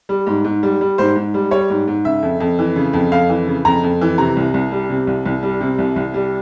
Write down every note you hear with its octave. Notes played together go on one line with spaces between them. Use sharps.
G3
G#2
G#2
G3
G3
G#2 C5
G#2
G3
G3 C#5
G#2
G#2
C#3 E5
F2
F2
E3
C#3
F2
F2 F5
E3
C#3
F2 A#5
F2
E3
C3 A#5
C2
C2
G3
C3
C2
C2
G3
C3
C2
C2
G3